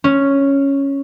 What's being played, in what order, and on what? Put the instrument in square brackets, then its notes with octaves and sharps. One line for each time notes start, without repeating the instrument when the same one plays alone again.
[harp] C#4